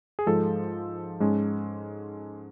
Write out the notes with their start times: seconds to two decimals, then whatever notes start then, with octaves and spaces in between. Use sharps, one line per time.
0.19 G#4
0.26 G#2 F3 G#3 A4
1.20 G#2 G#3 C#4